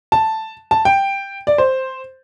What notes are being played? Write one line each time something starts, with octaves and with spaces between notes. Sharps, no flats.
A5
A5
G5
D5
C5